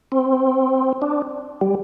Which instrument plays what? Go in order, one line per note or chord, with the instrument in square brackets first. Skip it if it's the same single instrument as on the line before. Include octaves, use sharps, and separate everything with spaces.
[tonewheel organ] C4
D4
G3